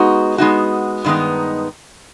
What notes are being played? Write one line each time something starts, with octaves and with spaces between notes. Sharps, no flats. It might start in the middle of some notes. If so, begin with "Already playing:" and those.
Already playing: G#3 B3 D#4 F#4
G#3 B3 D#4 F#4
G2 D#3 G#3 B3 D#4